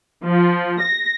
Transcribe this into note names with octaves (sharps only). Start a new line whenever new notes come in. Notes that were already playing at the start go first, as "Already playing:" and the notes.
F3
A#6